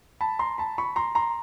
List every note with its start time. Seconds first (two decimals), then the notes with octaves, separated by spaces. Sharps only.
0.21 A5 B5
0.39 A#5 C6
0.58 A5 B5
0.78 B5 C#6
0.96 A#5 C6
1.15 A#5 C6